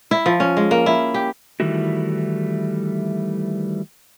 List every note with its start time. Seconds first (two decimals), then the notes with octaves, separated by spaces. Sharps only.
0.11 E4
0.26 F3
0.40 C#4
0.57 G#3
0.71 A#3
0.86 E4
1.14 G4
1.60 D#3 E3 G3 A3 E4 F#4